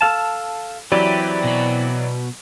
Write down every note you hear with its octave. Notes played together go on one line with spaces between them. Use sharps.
A4 F5 A5
E3 F#3 C4 E4 G4 B4 D5
B2 B5